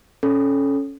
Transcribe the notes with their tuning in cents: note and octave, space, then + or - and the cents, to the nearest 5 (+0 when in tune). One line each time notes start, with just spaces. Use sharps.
C#4 +0 A4 -20